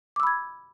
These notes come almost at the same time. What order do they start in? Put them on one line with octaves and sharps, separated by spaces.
D6 E6 B5 G#6